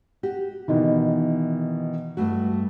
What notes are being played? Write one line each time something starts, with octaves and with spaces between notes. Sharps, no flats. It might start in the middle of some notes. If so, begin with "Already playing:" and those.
F#4 G4
B2 D#3 E3
G2 A3 F#4